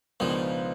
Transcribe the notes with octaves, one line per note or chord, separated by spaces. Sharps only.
C#2 B2 D#3 F3 G#3 B3 D4